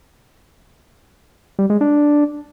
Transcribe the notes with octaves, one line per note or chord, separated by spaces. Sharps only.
G3
G#3
D4